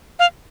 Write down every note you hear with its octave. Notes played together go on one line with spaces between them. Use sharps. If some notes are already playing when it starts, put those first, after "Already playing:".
F5